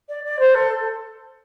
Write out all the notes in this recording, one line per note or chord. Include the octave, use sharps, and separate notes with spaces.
D5
D5
C5
A4